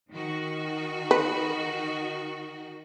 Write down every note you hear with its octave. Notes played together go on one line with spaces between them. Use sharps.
D#3 F#4
B4